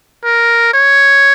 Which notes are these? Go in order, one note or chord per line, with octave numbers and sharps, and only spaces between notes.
A#4
C#5